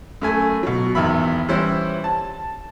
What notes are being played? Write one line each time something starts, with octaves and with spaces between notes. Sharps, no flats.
F#2 A3 G#5
B2 F#3
G#1 E2 D#3 E5 B5
E3 G3 C#4 E4 C5
A5